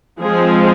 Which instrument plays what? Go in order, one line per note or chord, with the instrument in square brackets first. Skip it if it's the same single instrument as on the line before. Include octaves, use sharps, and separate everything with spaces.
[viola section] F3 G#3 C4 G#4